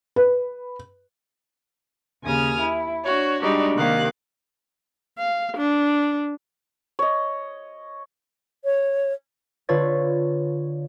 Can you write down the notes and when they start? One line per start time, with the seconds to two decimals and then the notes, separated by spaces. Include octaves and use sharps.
0.16 B4
2.23 D#2 C#3 G#5 D#6 F6
2.60 E4
3.04 D4 F#4 C#5
3.42 G3 G#3 D4 D#4 F#4 G4
3.76 C3 D#3 A#3 F5 F#6
5.19 F5
5.57 D4
6.99 C#5 D#5
8.64 C#5
9.69 D3 F4 B4 C#5 A6